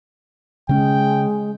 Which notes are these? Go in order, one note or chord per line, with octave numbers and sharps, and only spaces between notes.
C#3 G#3 C#4 G5